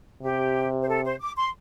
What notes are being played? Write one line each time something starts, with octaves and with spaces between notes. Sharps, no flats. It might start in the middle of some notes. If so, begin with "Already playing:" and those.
C3 G4
C5
A4
C5
D6
C6